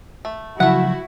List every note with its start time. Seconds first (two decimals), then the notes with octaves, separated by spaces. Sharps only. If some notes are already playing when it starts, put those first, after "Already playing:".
0.25 A3
0.60 C#3 F3 F#3 A3 E4 F#4 F#5